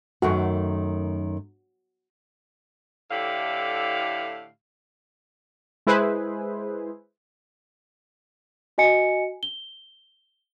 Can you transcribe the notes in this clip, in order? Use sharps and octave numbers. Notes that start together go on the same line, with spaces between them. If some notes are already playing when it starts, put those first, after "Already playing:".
F#2 D#3 A3 F#4
A2 D3 E4 G4 F5
G#3 E4 G#4 B4 C5
F#4 D#5 G#5 C#7
G7